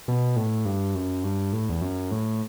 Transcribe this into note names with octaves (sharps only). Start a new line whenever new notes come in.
B2
A2
G2
F#2
G2
A2
E2
F#2
A2